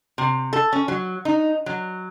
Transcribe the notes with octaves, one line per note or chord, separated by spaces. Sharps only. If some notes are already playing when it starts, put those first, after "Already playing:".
C3
A4
C#4
F#3
D#4
F#3